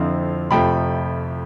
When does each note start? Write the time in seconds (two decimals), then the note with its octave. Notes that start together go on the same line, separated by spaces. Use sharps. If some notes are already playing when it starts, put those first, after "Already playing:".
Already playing: F2 D3 F3 C4 E4 F5
0.51 F2 C3 F3 A3 G5 B5